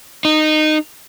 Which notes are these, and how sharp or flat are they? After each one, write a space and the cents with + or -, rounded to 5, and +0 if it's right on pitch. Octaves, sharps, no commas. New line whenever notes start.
D#4 -15